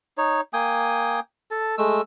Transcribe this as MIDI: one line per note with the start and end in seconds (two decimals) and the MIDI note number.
0.18 0.41 63
0.18 0.41 73
0.53 1.20 58
0.53 1.20 79
0.53 1.20 80
0.53 1.20 87
1.51 1.75 69
1.51 1.75 81
1.78 2.01 56
1.78 2.01 57
1.78 2.01 88